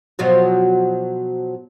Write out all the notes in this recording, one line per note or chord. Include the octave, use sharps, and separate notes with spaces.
B2 F3 F#3